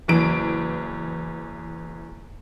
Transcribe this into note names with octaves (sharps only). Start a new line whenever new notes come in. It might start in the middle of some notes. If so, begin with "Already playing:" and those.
F#1 E2 E3 D7